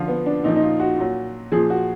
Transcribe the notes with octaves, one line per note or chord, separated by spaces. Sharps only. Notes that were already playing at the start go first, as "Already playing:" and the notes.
Already playing: D3 F3 F4
B3
D4
A#2 F3 D#4
D#4
F4
F#4
A#2 F#3
A#2 F3 G#4
F#4